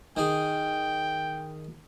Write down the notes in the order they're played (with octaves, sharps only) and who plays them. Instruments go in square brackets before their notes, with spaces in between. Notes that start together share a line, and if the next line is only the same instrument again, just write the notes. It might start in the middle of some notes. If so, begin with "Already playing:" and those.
[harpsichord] D#3 G#4 [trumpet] G5